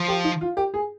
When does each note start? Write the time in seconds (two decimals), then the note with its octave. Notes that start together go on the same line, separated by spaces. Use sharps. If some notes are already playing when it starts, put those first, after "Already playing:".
Already playing: F3
0.08 G4
0.24 D#4
0.41 F4
0.57 G4
0.74 G#4